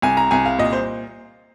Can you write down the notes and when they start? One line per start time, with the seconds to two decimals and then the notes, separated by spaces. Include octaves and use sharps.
0.02 C2 G#5
0.17 A#5
0.31 C2 G#5
0.45 F5
0.59 A#2 D#5
0.73 C5